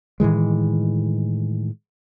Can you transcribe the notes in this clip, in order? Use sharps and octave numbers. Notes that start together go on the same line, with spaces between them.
A2 D#3 E3 G#3